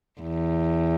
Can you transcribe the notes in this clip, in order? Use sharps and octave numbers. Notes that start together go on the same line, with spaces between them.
E2